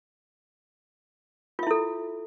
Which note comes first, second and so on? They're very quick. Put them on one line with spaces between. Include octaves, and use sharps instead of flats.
F4 E5 E4 A4